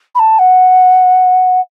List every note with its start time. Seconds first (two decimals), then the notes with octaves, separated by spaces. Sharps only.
0.15 B5
0.19 A5
0.39 F#5